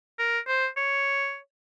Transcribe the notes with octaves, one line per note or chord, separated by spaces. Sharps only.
A#4
C5
C#5